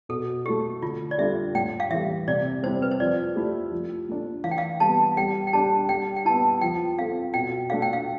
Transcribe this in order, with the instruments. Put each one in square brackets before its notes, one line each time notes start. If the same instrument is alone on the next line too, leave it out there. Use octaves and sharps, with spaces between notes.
[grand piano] B2 [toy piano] A4
[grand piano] A3 E4 A4 [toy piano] G4
[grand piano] D3 [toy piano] F4
[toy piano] D5
[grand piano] G3 D4 F4 A4 [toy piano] E5
[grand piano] A2 [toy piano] G5
[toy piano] F5
[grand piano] E3 G3 [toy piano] E5
[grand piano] C3 [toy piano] D5
[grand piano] G3 C4 E4 [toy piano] C5
[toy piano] B4
C5
[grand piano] F3 [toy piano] D5
[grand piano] A3 E4 G4
F3
A3 D4
[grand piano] E3 [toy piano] F5
[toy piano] G5
F5
[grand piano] G3 B3 [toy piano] A5
[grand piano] G3 [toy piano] G5
[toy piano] G5
[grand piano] D4 G4 [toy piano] A5
[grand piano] G3 [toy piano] G5
[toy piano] G5
[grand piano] B3 E4 [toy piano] A5
[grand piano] F3 [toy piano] G5
[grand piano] C4 F4 A4 [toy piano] F5
[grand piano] B2 [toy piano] G5
[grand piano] A3 D4 A4 [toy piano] F5
[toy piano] G5
F5